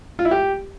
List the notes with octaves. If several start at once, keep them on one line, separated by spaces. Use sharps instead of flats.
F4
E4
G4